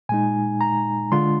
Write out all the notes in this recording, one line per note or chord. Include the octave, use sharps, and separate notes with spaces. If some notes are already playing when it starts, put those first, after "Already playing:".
A#2 G#3 D#4 G#5
A#5
D3 G#3 D4 F4 C6